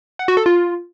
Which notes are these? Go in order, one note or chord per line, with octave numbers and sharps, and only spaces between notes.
F#5
F#4
A4
F4